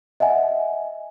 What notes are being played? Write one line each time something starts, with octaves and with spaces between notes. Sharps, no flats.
D#5 E5 F#5 G#5